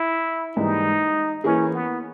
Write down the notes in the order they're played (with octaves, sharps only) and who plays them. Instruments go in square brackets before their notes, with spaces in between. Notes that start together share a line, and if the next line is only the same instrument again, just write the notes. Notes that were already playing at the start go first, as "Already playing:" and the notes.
Already playing: [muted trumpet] E4
[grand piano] G#2 E3 G3 A#3 [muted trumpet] D#4
[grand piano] E3 A#3 E4 G#4 [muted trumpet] C#4
[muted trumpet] B3